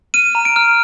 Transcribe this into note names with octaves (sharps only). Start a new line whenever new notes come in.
F6 D#7
A#5
D7
F6